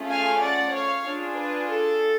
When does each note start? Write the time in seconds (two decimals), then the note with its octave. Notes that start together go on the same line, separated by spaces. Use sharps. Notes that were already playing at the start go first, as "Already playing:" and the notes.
Already playing: A3 C#4 F4 G#4
0.08 F5 G#5
0.40 D5 F#5
0.72 C#5 F5
1.03 D4 F4 G#4
1.35 B4
1.68 A4